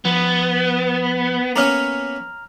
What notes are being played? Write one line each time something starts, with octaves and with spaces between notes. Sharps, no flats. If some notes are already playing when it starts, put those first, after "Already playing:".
F3 B3
A#3 B3 C#4 A#5 F6